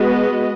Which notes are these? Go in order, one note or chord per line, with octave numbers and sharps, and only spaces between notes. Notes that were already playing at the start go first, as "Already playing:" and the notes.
Already playing: G#3 B3 F#4 B4 D#5